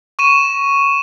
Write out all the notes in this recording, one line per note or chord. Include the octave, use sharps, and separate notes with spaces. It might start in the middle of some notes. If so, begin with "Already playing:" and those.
C#6 D#7 E7